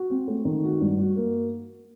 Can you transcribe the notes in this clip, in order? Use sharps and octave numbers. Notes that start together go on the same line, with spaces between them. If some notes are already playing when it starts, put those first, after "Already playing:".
Already playing: F#4
C4
A3
D#3
F#4
G2
F#4
A#3